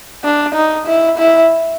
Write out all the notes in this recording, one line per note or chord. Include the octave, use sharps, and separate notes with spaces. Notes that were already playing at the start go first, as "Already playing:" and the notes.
D4
D#4
E4
E4